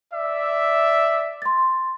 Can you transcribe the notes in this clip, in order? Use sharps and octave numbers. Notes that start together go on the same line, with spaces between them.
D5 E5
C6 A6